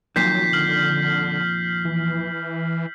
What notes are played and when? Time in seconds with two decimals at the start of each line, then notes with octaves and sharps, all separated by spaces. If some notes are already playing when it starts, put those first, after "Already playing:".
0.16 F2 A#2 D#3 F#3 G6 B6 C7
0.53 D3 F6 F#7
1.85 E3